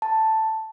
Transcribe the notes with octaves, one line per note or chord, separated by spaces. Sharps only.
A5